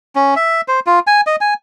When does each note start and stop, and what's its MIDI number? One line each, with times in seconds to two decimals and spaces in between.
0.16 0.34 61
0.36 0.61 76
0.68 0.80 72
0.87 0.99 65
1.07 1.21 80
1.27 1.36 75
1.41 1.54 80